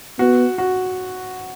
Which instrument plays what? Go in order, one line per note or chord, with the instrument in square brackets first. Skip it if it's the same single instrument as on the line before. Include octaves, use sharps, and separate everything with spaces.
[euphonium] B3 [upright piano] F#4
[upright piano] F#4